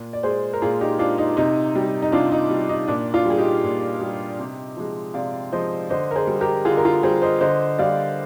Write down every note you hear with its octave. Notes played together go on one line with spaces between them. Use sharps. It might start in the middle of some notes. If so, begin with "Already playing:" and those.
Already playing: A#2
D5
G#3 G#4 C5
A#4
A#2 F4 G#4
D#4 G4
G#3 D4 F4
D#4
C3 D#4
G3
D#4
C3 D4 F4
D#4
G3
D#4
A#2 D4
D4 F4
G3 G#4
D#4 G4
A#2
G3
C3
F3 G#3
C3 D5 F5
F3 G#3 C5 D#5
D3 C5 D#5
A#4
G#4 C5
G3
G4 A#4
D3 F4 G#4
A#4
F4 G#4
G3 G#4 C5
C5 D#5
D3 C5 D#5
G3 D5 F5